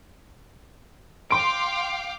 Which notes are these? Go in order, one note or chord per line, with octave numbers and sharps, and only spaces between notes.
F5 G5 C6 D6 D7